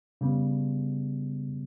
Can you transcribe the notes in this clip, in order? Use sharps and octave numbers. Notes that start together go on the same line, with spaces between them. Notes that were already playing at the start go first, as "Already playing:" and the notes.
C#3 G3 B3